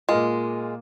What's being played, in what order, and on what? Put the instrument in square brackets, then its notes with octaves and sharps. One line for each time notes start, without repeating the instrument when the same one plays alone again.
[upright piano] A#2 A#3 F4 [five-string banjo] G#3